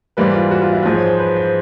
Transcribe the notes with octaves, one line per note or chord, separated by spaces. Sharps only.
G#2 E3 G3 A#3 B4
F4
F#4
F4
E4
G#2 F3 G#3 F4
C#5
C5
B4
C5